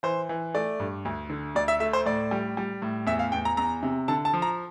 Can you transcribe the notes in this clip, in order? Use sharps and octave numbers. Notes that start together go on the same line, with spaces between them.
E3 C5
E3
A3 D5
G2
D2
D3
D2 D5
E5
A3 E5
C5
A2 D5
G3
G3
A2
E2 E5
F5
E2 G5
A#5
E2 A#5
C3
D3 A5
A5
F3
A#5